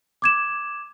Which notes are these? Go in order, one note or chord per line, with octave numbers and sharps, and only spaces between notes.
D6 G#6 E7